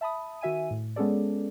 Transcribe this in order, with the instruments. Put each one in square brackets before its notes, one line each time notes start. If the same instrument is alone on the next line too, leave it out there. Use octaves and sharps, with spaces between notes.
[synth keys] E5 A5 B5 D#6
D#3 F#4 E5 G#5 D#7
A2
G#3 B3 C#4 G#4 A4 D5